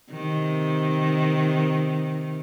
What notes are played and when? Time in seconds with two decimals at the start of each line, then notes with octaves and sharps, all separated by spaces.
0.11 C3 D#3